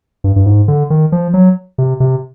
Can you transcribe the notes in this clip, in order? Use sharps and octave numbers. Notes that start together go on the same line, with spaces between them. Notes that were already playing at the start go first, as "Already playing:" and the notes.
G2
G2
G#2
D3
D#3
F3
F#3
C3
C3